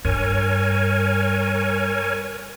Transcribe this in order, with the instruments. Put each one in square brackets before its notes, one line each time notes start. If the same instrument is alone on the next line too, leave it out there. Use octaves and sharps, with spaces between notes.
[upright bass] G2 [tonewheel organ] A#4 C#5 G#5